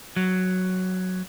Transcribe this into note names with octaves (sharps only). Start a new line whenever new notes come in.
F#3